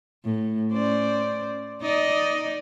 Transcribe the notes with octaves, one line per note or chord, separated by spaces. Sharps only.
A2
C#4 C5 D5
D#4 D5 D#5